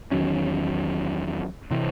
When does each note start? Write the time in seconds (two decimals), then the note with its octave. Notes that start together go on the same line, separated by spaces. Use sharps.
0.11 E2 D#3 F#3 C#4
1.71 C3 E3 C4